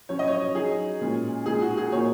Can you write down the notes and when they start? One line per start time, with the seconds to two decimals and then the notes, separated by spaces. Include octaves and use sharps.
0.09 F#3 C#4 C#5
0.19 D#5
0.28 C#5
0.55 F#3 D#4 G#4
1.01 A#2 G#3 C#4
1.46 A#2 G#3 D#4 G#4
1.62 F#4
1.77 G#4
1.92 A#2 A#3 D#4 C#5